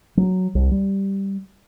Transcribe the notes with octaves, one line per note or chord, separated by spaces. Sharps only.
F#3
C2
G3